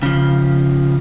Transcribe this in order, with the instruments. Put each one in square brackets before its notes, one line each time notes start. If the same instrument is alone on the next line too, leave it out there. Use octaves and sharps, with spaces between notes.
[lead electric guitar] C#3 F3